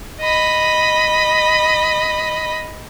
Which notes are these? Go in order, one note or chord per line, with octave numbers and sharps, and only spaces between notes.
D#5 B5